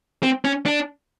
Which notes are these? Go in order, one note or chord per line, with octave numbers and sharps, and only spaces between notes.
C4
C#4
D4